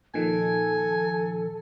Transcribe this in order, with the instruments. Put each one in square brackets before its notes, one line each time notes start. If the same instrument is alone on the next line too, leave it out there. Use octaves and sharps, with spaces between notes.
[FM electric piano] A#2 D#3 F3 [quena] A4 [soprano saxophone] G#5